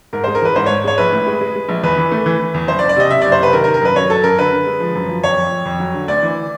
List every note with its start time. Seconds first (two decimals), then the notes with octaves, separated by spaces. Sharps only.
0.13 G#2 A#4
0.24 G#3 C5
0.35 A#4
0.41 E3 B4
0.56 G#2 C5
0.66 G#2 C#5
0.84 G#3 C#5
0.98 A#1 B4
1.12 A2
1.27 G#3
1.41 G#3
1.55 G#3
1.69 A#1
1.83 E2 B4
1.98 E3
2.12 A3
2.26 E3
2.39 E3
2.54 E2
2.68 F#1 C5
2.79 D5
2.82 F#1
2.89 D5
2.96 C3 D#5
3.10 C3 E5
3.22 F#1 D5
3.32 C5
3.39 C3 B4
3.53 D#3 A#4
3.64 A#4
3.67 D#3
3.74 A#4
3.82 F#2 B4
3.95 F#2 C#5
4.10 F#3 A4
4.24 F#2 A#4
4.38 D3 B4
4.52 D3
4.67 G#3
4.80 F3
4.95 F#2
5.09 F3
5.24 F2 C#5
5.37 F2
5.52 F2
5.66 F2
5.80 F#3
5.94 D3
6.08 D2 D5
6.22 E3